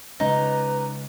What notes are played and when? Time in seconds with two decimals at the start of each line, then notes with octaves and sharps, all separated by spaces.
0.20 C#3 G#3 C#4 D#4 B4 A#5